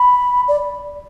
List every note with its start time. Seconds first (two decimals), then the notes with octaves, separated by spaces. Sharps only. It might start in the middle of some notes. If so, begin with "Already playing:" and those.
Already playing: B5
0.48 D5